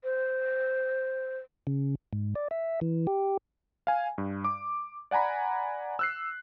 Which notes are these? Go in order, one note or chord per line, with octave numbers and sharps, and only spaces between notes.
C5
C#3
G#2
D5
E5
E3
G4
F5 G#5
G2
D6
D5 F#5 G#5 A#5 B5
E6 F#6 C7